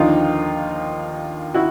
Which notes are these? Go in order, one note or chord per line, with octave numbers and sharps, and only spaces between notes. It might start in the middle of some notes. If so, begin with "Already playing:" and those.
Already playing: D#2 D3 F3 D#4 F4
E4 F#4